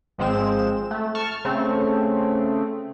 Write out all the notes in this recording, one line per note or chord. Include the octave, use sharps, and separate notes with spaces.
G#1 F3 G#3 C4 E7
A3
A5 C#6 F6
C#3 A3 C4